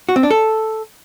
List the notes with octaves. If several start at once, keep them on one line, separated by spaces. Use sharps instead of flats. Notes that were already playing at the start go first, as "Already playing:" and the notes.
F#4
C4
D4
A4